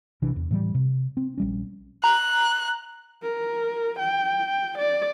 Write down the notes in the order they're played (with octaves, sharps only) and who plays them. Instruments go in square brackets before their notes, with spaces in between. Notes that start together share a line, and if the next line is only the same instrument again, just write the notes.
[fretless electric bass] A#1 C3 E3 D4
E2
A2 E3 G3
C3
C4
A#1 G3 C#4
[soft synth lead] A#5 [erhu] F#6
[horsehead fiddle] A#4
G5
D5